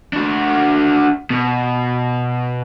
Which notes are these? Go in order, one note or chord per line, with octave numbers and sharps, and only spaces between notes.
D4 F#4
B2